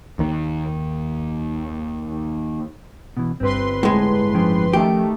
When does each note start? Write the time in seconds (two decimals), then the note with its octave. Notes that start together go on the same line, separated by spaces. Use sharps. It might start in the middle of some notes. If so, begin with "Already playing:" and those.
0.19 D#2 D#3
3.17 B2 E3
3.40 G1 C4 G4 B4 C6
3.83 A2 G#3
4.35 F3 C#4 G5
4.73 D#3 A3 G4